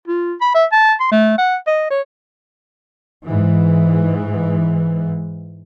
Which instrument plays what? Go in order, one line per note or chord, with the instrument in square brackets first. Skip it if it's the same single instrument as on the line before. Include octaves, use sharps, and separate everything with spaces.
[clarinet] F4
B5
E5
A5
C6
A3
F#5
D#5
C#5
[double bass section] G#2 E3